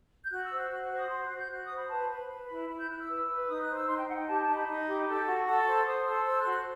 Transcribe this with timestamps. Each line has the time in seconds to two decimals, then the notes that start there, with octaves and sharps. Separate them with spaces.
0.24 G6
0.31 F#4 F#6
0.45 E6
0.52 C5
0.58 F#6
0.71 F#4 F#6
0.84 F#6
0.92 C5
0.98 D#6
1.11 F#4 C6
1.25 F#6
1.30 F#4
1.37 G6
1.51 F#4 F#6
1.64 D#6
1.70 C5
1.77 B5
1.90 B4 A5
2.09 B4 B5
2.30 B4
2.49 E4
2.69 E4 B5
2.79 G6
2.89 E4 F#6
2.99 E6
3.09 B4
3.29 B4
3.48 D#4 D#6
3.61 F#6
3.68 C5
3.74 E6
3.88 D#4 C6
3.98 G5
4.07 D#4 F#5
4.18 G5
4.28 G4 A5
4.41 A5
4.48 D#4
4.54 B5
4.67 D#4
4.88 G4
5.07 A4
5.26 F#4
5.47 A4
5.67 C5
5.86 C5 D#6
6.06 A4 E6
6.25 C5 E6
6.39 F#6
6.45 F#4
6.52 F#6